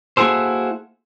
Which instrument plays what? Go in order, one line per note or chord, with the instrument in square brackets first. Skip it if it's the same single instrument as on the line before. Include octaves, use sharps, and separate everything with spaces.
[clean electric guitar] A#3 E4 F#4 G#4 A4 C5